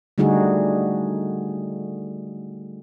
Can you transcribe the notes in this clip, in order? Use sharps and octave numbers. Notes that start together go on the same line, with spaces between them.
D3 G3 A3 D#4 F#4 G#4